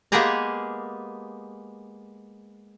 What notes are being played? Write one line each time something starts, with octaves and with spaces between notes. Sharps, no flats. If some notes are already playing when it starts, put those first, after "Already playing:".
G#3 A#3 B3 G4 G#4 A#5